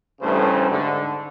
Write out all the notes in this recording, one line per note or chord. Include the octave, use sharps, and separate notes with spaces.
A1 G2 C#3 A3 C5
G#2 D3